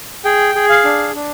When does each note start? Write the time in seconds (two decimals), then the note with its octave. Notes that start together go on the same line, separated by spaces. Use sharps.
0.25 G#4 G5
0.55 G#4
0.69 F5
0.85 D4
1.15 D4